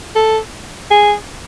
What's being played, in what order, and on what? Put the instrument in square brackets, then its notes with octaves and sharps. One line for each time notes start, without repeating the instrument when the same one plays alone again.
[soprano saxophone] A4
G#4